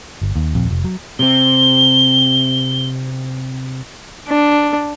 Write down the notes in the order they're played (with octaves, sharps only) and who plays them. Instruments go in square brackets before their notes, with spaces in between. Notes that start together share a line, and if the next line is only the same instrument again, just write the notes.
[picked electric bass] G1
D#2
D#1 A#1 F2
F1
F#3
[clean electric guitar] C3 C4 [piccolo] G7
[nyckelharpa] D4